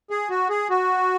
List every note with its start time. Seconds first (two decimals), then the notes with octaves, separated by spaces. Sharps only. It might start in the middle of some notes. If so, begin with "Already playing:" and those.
0.10 G#4
0.30 F#4
0.50 G#4
0.70 F#4